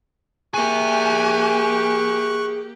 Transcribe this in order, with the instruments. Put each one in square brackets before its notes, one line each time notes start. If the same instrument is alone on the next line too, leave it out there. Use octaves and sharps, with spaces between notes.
[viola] A#3 G4 [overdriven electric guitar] G#4 E5 [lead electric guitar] G#5 [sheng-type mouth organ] C#6 F#6